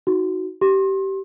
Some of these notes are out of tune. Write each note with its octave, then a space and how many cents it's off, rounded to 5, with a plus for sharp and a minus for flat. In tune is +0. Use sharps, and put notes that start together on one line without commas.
D#4 +25 F#4 +0
G4 -20 C6 +35